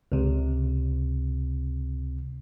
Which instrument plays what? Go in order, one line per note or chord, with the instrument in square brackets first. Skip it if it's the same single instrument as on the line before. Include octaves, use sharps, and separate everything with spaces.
[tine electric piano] C#2 C3